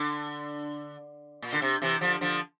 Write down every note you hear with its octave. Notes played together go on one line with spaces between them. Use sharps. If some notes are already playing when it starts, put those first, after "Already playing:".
Already playing: D3
A#2
D3
C3
C3 E3
D3 F3
D3 F3